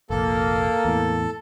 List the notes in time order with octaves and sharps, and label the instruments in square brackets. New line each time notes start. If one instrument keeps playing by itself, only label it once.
[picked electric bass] F1 A#1 [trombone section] A#3 [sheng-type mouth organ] A4
[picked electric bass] E2 A2